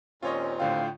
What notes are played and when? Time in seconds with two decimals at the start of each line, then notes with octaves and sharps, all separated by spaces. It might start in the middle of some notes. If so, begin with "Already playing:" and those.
0.22 D#2 A#2 C4 C#4 F4 C#5 D#5
0.60 A2 D3 F4 F5 G5